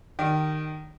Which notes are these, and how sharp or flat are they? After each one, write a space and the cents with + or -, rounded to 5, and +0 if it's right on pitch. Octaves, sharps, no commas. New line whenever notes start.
D#3 -15 G4 +0 D5 +0